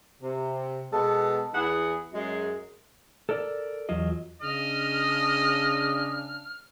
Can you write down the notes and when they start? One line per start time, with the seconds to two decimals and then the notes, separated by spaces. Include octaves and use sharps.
0.22 C3
0.92 B2 G#3 B3 A4
1.54 E2 E4 G#4 F#5
2.13 F#2 G#3
3.29 A4 A#4 D5
3.89 E2 F#3 F4 D#5
4.42 C#3 D4 D#5 F6